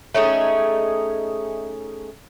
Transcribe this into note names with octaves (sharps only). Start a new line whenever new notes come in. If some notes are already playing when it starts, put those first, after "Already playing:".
A3 C#4 D#4 G#4